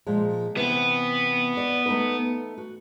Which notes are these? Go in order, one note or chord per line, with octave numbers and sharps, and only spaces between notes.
A#2 F3 G#3
C3 E3 B3
D5
A3 D#4 B4
F#4